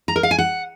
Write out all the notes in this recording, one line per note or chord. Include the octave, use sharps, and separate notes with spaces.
A#5
A#4
F5
G#5
F#5